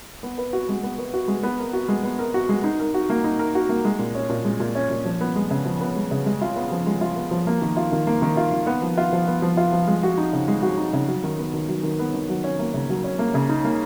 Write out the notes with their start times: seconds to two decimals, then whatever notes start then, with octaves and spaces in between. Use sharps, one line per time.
0.23 B3
0.38 B4
0.53 F#4
0.69 G#3
0.83 B3
0.98 B4
1.14 F#4
1.28 G#3
1.43 B3
1.59 A#4
1.73 F#4
1.88 G#3
2.04 B3
2.19 A#4
2.34 F#4
2.49 G#3
2.64 D#4
2.79 A#4
2.94 F#4
3.10 A#3
3.24 D#4
3.39 A#4
3.55 F#4
3.69 A#3
3.85 G#3
3.99 A#2
4.15 C#4
4.29 A#2
4.45 G#3
4.60 A#2
4.75 C#4
4.90 A#2
5.05 F3
5.21 B3
5.36 G#3
5.51 C#3
5.65 F3
5.81 B3
5.96 G#3
6.11 C#3
6.26 G#3
6.41 F4
6.56 B3
6.71 F3
6.86 G#3
7.01 F4
7.16 B3
7.31 F3
7.47 A#3
7.62 D#3
7.77 F4
7.92 D#3
8.07 A#3
8.22 D#3
8.37 F4
8.52 D#3
8.67 B3
8.82 F3
8.97 F4
9.13 F3
9.27 B3
9.42 F3
9.57 F4
9.73 F3
9.87 G#3
10.03 F#4
10.18 D#4
10.33 C#3
10.48 G#3
10.63 F#4
10.78 D#4
10.93 C#3
11.08 F#3
11.23 D#3
11.39 B3
11.54 D#3
11.68 F#3
11.83 D#3
11.99 B3
12.14 D#3
12.29 F#3
12.44 C#4
12.59 A#3
12.74 C#3
12.89 F#3
13.04 C#4
13.19 A#3
13.34 C#3
13.49 D#4
13.64 A#3